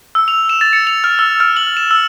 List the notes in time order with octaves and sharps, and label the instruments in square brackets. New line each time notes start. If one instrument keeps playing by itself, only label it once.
[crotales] E6
F7
E7
A6
C#7
F7
F6
E6
F6
F#7
E7
E6